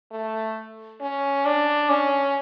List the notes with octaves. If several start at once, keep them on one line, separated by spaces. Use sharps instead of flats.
A3
C#4
D4
C#4